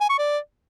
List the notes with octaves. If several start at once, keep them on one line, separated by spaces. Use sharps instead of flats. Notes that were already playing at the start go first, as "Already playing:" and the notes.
G#5
C#6
D5